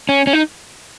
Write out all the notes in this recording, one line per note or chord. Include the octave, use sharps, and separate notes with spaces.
C#4
C#4
D#4